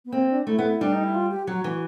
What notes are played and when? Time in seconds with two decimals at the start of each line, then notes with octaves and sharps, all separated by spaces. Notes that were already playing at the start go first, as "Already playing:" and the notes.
0.05 B3
0.12 A#3 C4
0.30 D4
0.47 A3 E4
0.59 B3
0.81 G3 D4
0.93 D#4
1.03 E4
1.15 F4
1.31 G4
1.47 F#3 F#4
1.64 E3